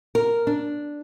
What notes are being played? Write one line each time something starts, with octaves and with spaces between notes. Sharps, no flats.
A#4
D4